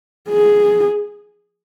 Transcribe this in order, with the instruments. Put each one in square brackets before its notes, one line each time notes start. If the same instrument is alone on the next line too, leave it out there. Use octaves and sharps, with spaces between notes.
[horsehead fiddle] G#4